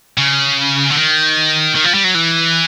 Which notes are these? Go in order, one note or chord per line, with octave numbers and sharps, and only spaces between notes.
C#3
D3
D#3
D#3
F3
G3
F#3
E3